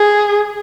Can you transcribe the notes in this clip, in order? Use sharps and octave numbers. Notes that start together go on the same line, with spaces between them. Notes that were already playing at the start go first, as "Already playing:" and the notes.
Already playing: G#4